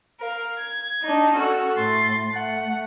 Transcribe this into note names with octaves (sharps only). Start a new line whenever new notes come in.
A#4 F5
G#6
D4 D#4 D#5
C#4 F#4 A4
A2 C6 A6
A3 F#5